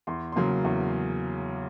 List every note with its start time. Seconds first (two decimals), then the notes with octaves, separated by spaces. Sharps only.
0.07 E2 C6
0.32 C#3 F#3 A#3 C6
0.64 E2